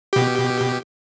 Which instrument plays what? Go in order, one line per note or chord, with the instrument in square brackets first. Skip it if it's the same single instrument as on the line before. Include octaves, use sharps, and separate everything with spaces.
[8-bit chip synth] B2 G4